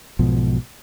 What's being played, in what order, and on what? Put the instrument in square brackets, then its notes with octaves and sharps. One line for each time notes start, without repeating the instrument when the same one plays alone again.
[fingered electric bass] B1 G#2 B2 F3